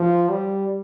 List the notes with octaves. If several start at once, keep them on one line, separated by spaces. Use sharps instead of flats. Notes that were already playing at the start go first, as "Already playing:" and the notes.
Already playing: F3
G3